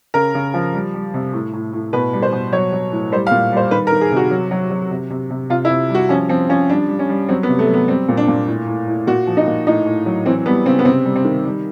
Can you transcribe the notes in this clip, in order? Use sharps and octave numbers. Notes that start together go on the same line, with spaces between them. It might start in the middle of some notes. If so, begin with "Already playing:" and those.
C#3 A#4
C#3
F3
G3
G3
C3
A2
A2
A2
B2 B4
G3
C5
B2
F#3 C#5
F#3
A2
G3 C5
F5
A#2
G3 C5
D#3 B4
A#4
D#3
G#4
C3 F#4
F#3
F#3
F#3
C3
C3
C3
C3 F4
E4
C3
G3
F#4
F3 C#4
F3 C4
F3 C#4
G3 D4
G3
C#4
G3
F#3 C4
B3
C3
A3
F#3
B3
G3 C4
A#2
D4
A#2
A2
A2
A2
A#2 F#4
F3
D#4
A#2
A2 D#4
A2
F#3
E3 C4
G3 B3
C#3 C4
B3
C3 C4
G3
C4
D#3
G3